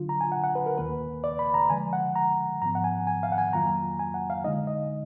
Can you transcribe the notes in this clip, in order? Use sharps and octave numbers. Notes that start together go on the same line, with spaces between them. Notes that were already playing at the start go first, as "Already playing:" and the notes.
Already playing: D3 F#3 D4 F4
A#5
G#5
F#5
F#5
B4
A#4
D#2 D#3 A#3 B4
D5
B5
A#5
D3 F3 G#3 G#5
F#5
A#5
G#2 F3 B3 A#5
F#5
G#5
G#5
F5
F#5
G#5
F2 D#3 F#3 A#3 F4 A#5
G#5
F#5
F5
D3 G#3 D#4 D#5
D#5